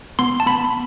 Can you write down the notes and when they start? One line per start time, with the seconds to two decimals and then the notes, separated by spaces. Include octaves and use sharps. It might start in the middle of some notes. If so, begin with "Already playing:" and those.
0.19 B3 C6
0.40 A5
0.47 B3 B5